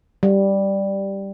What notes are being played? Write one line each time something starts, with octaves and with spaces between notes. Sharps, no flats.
G3